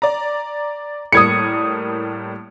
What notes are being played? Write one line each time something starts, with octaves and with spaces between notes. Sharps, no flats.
D5 A#5
A2 G3 A#3 D#6 G#6 C#7